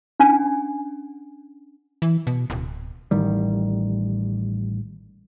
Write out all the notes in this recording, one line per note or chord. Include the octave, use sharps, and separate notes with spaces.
C#4 D4 F#5 G#5
E3
B2
D1
A1 D#3 G3